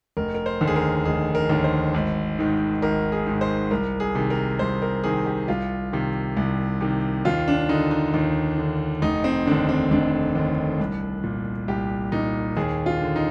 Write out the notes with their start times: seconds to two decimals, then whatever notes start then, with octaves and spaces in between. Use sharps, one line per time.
0.17 F1 A#4
0.34 A#4
0.46 C5
0.61 D#2 D3
0.67 G#4
0.76 A#4
1.05 F1 G#4
1.35 A#4
1.50 D#2 D3
1.64 C5
1.94 G#1
2.39 G#2 D#3
2.82 G#1 A#4
3.12 G#4
3.27 G#2 D#3
3.41 C5
3.71 C2 A#4
4.00 G#4
4.15 C3 D#3
4.30 A#4
4.59 C2 C5
4.82 A#4
5.04 C3 D#3 G#4
5.26 G4
5.48 C2 F4
5.92 C3 D#3
6.37 C2
6.81 C3 D#3
7.25 D#2 F4
7.48 D4
7.69 D3 D#4
7.91 D#4
8.14 D#2
8.58 D3
9.02 F1 D#4
9.24 C4
9.47 D#2 D3 D4
9.69 C4
9.91 F1 D4
10.35 D#2 D3
10.80 C2
11.24 A#2
11.68 C2 G4
12.12 A#2 D#4
12.57 D#2 G#4
12.86 F4
13.01 D3
13.16 D#4